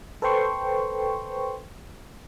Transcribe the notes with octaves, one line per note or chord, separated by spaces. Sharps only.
A4 B4 C5 G5 C6 C#6